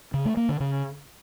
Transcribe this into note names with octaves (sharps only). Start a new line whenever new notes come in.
C#3
A3
A#3
D3
C#3